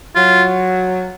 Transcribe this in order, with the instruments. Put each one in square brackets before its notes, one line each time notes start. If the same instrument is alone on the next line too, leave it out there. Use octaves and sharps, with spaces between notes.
[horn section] F#3 [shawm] F4